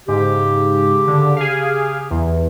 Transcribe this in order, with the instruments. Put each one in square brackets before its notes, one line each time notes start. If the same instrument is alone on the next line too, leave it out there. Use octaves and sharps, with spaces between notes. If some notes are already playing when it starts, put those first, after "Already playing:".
[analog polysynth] G#2 [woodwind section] C#3 G4
[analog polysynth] D3
G#4 F5
E2